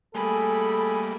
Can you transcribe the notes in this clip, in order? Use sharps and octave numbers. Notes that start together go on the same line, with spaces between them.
G3 A3 A#3 G#4 A4 G#5 B5